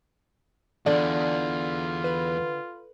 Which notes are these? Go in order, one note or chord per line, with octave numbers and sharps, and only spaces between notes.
E2 D3 F4 D5
B4